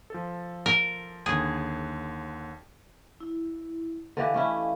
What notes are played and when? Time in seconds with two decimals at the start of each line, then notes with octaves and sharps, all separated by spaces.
0.10 F3 A4
0.66 A#4
1.26 D#2 D3 G#4
3.21 E4
4.17 D3 E3 G4 A4 D#5 F5
4.34 A3 C#4 E4